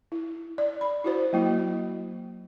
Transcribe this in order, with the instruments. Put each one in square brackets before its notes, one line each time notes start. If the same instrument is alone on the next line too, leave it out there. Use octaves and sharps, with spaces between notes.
[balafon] E4
D5
B5
E4 F#4 C5
F#3 A#3 E4